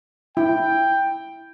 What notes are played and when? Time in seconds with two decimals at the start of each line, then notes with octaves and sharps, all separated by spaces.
0.37 E4 G5